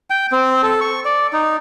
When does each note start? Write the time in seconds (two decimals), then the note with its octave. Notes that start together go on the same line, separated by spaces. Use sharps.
0.10 G5
0.32 C4
0.63 A4
0.81 C#6
1.05 D5
1.33 D#4